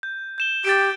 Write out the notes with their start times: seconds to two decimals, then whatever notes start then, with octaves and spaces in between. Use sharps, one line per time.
0.03 G6
0.38 G6 E7 G7
0.65 G4 A6 D7